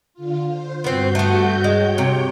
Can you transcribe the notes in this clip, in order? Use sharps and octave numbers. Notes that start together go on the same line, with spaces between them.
D3 F4
C5
G2 B3 C4 F#4 G6
A3 B3
G#3 C#5 G5
C3